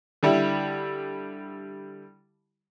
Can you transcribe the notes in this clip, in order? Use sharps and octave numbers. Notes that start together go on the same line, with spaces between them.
D3 G3 E4